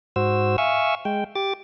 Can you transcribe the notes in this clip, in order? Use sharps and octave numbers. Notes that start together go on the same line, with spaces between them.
G#2 F#4 C5 E6
E5 F5 G#5 C#6 E6
G#3 G5
G4 D6 A6